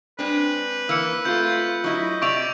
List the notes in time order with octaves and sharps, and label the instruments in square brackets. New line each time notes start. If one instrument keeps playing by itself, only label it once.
[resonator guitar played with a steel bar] G#3 C4 D4 [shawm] B4
[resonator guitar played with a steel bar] E3 A#3 [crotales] E6 C#7
[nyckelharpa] A3 F4 [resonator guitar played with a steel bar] C4 [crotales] G6
[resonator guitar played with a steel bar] F#3 E4 [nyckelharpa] D#5
[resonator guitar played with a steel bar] C3 E5 [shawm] D5 [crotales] C#6 D7 F7